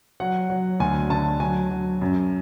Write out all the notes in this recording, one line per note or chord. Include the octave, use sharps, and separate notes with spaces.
F#3 F#5
F#3
D2 G#5
D3 A5
F#3 G#5
F#3
F#2